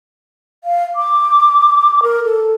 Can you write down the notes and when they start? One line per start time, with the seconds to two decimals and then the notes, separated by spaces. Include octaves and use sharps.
0.64 F5
0.96 D6
2.03 A#4
2.24 A4